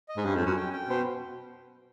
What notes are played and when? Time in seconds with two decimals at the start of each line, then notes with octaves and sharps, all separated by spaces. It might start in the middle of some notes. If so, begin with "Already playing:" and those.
0.09 D#5
0.17 G#2
0.25 G2 C#4
0.35 F2
0.40 C#4
0.46 F#2
0.56 G5
0.73 G5
0.89 B2 C5